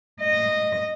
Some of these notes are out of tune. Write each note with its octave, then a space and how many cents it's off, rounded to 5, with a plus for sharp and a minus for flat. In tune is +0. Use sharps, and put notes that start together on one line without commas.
D#5 -15